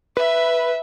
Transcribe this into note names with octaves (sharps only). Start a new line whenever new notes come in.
B4 E5